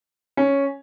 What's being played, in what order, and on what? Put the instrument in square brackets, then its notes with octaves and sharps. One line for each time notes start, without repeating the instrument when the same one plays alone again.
[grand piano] C#4